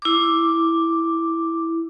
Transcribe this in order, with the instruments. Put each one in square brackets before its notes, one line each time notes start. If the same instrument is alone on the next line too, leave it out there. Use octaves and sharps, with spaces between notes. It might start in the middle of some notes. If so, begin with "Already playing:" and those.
[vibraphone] E4 D6